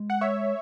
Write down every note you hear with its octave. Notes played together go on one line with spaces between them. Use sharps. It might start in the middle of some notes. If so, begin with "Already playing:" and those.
Already playing: G#3
F#5
C#5 E5